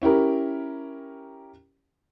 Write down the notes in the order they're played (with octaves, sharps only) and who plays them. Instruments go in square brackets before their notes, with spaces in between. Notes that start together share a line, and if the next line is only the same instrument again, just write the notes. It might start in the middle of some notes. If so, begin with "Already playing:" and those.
[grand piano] C#4 E4 G4 A#4